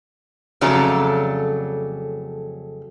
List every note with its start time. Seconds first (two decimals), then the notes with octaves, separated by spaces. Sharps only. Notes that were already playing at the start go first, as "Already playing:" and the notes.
0.61 F2 C#3 F#3 A3 D5 A#5